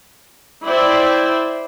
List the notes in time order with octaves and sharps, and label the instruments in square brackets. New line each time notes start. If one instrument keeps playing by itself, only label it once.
[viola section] E4 C5 D5 E5 G5